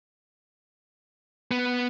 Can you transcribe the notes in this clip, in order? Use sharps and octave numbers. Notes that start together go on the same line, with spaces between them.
B3